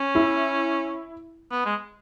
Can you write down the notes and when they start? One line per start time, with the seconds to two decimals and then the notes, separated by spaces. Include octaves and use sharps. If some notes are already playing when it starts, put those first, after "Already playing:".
Already playing: C#4
0.15 E4
1.52 B3
1.65 G#3